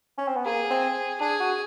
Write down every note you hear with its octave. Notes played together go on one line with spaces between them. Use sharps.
C#4
C4
B3
A#3 G#4
C4
D4 G#4
F#4